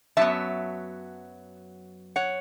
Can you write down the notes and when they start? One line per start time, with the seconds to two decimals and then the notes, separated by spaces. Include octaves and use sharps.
0.17 F#2 F#3 B3 E5 A5
2.16 C#5 F#5